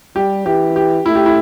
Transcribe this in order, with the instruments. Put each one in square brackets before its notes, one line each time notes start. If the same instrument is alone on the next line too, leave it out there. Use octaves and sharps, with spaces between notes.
[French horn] G3 [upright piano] G4
[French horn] E3 [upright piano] G4
[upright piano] G4
[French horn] A3 [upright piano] E4
[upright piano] G4
E4